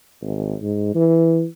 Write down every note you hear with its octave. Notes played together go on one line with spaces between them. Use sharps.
G#1
G#2
E3